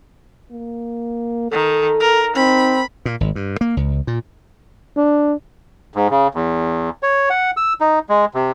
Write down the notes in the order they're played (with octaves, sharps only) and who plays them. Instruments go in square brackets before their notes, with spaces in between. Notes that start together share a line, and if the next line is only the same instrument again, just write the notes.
[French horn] A#3
[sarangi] D#3 [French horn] A4
[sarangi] A#4
[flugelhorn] C4 [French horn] D#4 [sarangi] B5
[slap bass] A#2
G#1
G2
A#3
C#2
A#2
[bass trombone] D4
[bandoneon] G#2
C#3
E2
C#5
F#5
E6
D#4
G#3
C3